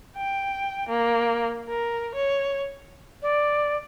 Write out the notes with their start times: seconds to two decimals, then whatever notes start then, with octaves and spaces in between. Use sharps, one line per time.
0.17 G5
0.89 A#3
1.69 A#4
2.15 C#5
3.22 D5